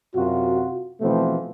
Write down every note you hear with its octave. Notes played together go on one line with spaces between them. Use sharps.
F#2 C3 F4 F#4
B2 E3 F3 A3 B3 C4